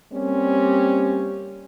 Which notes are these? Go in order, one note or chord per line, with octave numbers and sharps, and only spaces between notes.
G3 A#3 C4 C#4